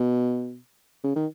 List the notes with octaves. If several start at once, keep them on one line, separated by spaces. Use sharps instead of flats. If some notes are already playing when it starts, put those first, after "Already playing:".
Already playing: B2
C#3
D#3